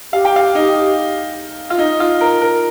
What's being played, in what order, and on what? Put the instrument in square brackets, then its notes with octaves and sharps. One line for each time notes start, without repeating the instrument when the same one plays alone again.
[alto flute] G4 [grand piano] F5
[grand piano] G5
F5
D#4
F4
D#4
F4
A#4
A#4